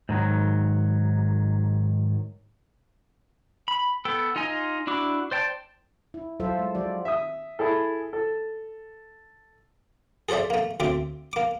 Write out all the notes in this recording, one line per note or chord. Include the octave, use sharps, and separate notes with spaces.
G#2 D#3 F#3
B5
B3 A4 G5
D#4 F4 D#5 G#5
D4 E4 F#4 D6
C5 D5 G5 A5
E4
F#3 F4 A4 C5 E5
G#3
F3 F#4 D5
E5 D#6
E4 G#4 A4
A4
G#4 A4 C5 D5 E5
A3 A#3
D2 C4 E5 D6
A#3 D6